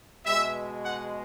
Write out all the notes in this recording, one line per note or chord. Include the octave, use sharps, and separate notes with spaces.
B2 G#3 E5
F#5